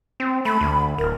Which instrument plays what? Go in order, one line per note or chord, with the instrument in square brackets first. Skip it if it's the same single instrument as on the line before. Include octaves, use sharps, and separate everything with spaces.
[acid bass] C4
[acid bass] A3 [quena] B5
[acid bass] D2
[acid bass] D1 [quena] A#4